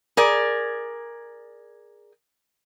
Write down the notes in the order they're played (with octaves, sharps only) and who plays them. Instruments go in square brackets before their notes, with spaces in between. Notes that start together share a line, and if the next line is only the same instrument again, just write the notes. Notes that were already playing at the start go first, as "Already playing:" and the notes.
[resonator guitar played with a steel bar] G#4 A#4 D5